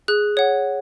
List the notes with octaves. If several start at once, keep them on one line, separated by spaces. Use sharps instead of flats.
G#4 F#6
C#5 F#5